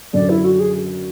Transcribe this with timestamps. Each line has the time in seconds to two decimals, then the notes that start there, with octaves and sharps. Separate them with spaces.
0.13 F#2 D3 F#3 D5
0.29 E4
0.44 F#4
0.59 G#4